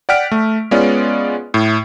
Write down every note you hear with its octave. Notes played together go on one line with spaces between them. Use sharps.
D5 F#5 G5 F6 B6 D7
A3
G#3 B3 C#4 F4 D5
A2